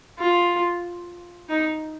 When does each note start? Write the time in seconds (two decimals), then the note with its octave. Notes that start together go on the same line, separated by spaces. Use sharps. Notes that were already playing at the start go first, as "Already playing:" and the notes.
0.19 F4
1.49 D#4